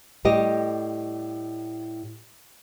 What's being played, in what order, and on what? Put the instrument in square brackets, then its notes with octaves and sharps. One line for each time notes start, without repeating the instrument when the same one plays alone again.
[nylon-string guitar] A2 G3 G4 D#5